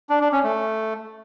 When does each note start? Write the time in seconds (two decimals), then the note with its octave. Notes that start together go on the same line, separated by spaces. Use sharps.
0.09 D4
0.21 D4
0.32 C#4
0.43 A3